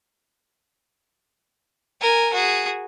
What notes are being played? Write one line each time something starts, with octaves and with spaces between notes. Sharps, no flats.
A#4 G#5
F#4 G#4